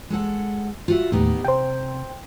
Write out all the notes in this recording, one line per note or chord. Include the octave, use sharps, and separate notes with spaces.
G#3 A4 F#5
F4 F#4 E5
D#2 A2 B3 D#4 G4
C3 C5 G5